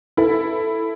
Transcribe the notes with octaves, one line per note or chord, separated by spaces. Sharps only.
E4 A4